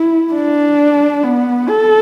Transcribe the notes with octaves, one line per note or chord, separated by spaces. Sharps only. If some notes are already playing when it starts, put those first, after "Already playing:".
Already playing: E4
D4
B3
A4